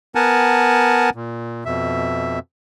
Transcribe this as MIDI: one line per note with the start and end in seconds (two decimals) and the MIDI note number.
0.15 1.10 59
0.15 1.10 70
0.15 1.10 78
0.15 1.10 80
0.15 1.10 81
1.15 1.64 46
1.65 2.39 41
1.65 2.39 47
1.65 2.39 76